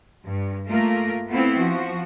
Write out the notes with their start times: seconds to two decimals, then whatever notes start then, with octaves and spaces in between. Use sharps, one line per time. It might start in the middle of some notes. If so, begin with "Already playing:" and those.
0.25 G2
0.68 A3 A#3 F4 A#4
1.28 A3 B3 C4 E4 F4
1.58 F3 F#4